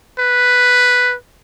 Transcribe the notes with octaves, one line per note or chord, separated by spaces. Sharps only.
B4